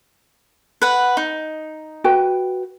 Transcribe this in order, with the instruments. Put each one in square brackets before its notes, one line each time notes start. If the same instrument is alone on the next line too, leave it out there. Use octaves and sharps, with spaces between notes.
[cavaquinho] B4 F#5
D#4
[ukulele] F#4 B4 G5